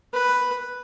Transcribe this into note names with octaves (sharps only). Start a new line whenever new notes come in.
B4